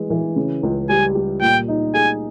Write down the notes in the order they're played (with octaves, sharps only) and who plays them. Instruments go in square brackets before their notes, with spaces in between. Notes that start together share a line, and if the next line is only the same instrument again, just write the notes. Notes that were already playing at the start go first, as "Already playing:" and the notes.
Already playing: [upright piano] E3 G#3
E3
C#3
C#2
[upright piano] G3 [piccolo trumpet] G#5
[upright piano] G3
[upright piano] A#2 [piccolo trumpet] G5
[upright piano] D#4
[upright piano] G#4 [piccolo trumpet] G#5